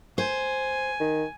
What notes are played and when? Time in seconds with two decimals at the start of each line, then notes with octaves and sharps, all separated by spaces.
0.18 C5 G#5
1.00 D#3